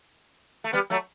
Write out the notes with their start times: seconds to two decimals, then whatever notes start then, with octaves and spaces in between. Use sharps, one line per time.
0.64 A3
0.73 G3 B3
0.90 F#3 A3